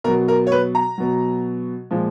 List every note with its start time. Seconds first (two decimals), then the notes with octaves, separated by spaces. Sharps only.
0.04 B2 A#4
0.08 F#3
0.28 A#4
0.47 C#5
0.52 B4
0.75 A#5
0.98 B2 F#3
1.91 A#2 F3 G#3